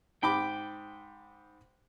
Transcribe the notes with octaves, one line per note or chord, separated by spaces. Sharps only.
G#2 G5 B5 D6